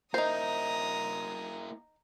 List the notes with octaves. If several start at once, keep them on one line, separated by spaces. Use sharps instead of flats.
A#3 D#4 E4 C5 A#5 D#6